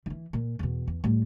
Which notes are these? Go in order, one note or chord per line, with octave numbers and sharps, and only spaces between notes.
D#3 E3
A#2
E2 B2
E2
A2 G3